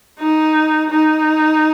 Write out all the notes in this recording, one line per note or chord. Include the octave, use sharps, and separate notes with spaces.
D#4
D#4